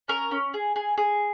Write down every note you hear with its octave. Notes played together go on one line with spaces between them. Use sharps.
C#4 A#4
C#4
G#4
G#4
G#4